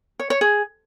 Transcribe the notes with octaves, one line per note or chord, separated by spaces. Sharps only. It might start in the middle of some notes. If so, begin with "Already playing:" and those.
C#5
C#5
G#4